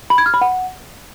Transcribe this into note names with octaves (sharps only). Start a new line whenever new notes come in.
B5
G#6
F6
B5
F#5